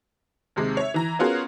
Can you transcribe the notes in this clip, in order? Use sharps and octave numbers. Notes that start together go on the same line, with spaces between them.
D#2 C3 G#3
C#5 E5
E3 A#5
B3 C#4 F4 F#4 G#4 A#4